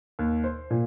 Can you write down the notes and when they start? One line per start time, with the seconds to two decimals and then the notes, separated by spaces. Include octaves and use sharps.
0.19 D#2
0.44 C5
0.71 A#2